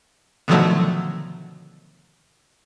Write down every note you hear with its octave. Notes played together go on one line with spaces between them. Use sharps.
B2 D3 D#3 F3 F#3 A3